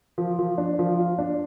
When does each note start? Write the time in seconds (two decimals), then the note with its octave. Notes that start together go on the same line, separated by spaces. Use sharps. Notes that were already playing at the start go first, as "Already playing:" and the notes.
0.18 F3
0.39 F3
0.58 D4
0.79 F3
0.98 F4
1.18 D4